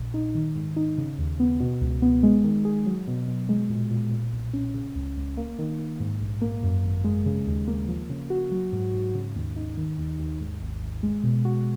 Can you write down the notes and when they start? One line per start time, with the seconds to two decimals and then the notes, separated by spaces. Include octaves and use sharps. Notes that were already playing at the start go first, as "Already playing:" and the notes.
Already playing: A#1 A#2
0.14 D#4
0.35 D#3
0.55 G#2
0.76 D#4
0.98 C#3
1.18 D#2
1.40 B3
1.60 B2
1.81 C#2
2.02 B3
2.23 G#3
2.44 D#3
2.65 G#4
2.86 F#3
3.08 B2
3.28 B2
3.49 G#3
3.70 A#2
3.91 A#2
4.12 A#2
4.33 B1
4.53 C#4
4.74 C#3
4.95 C#2
5.17 C#2
5.37 A#3
5.59 D#3
5.79 D#3
6.00 G#2
6.21 A#1
6.41 A#3
6.63 F#2
6.84 G#1
7.04 G#3
7.26 C#3
7.46 D#2
7.68 A#3
7.88 F3
8.10 C#3
8.30 F#4
8.51 F#3
8.72 G#2
8.94 G#2
9.14 C#3
9.35 D#2
9.56 D#4
9.77 D#3
9.98 D#2
10.19 D#2
10.40 G#2
10.61 G#1
10.82 G#1
11.03 G#3
11.24 B2
11.45 F#4